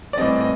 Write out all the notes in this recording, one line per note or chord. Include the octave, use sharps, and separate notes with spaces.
D5
A2 E3 G3 C4 D#5
D#5